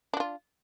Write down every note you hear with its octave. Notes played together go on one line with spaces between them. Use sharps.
D4 F4 F#4